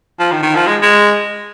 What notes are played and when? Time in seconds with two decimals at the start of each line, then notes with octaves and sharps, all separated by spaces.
0.19 F3
0.32 D#3
0.42 D#3
0.55 F3
0.67 G#3
0.82 G#3